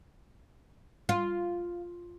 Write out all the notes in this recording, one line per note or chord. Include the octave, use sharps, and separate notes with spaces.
F4